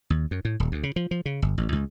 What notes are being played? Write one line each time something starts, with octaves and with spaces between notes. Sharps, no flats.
D#2
F#2
A2
D#1
D2
C#3
F3
F3
C#3
G1
A1
C#2